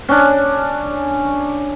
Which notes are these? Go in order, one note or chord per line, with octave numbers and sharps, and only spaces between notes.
C#4 D4